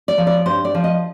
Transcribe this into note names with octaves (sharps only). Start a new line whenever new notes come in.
D5
F3
D5
G2 C5
D5
F3
D#5